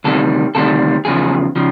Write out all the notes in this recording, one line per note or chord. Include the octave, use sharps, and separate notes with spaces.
D2 C3 D#3 G3 A4
D2 C3 D#3 G3 A4
E2 C#3 F3 G#4
C#3 F3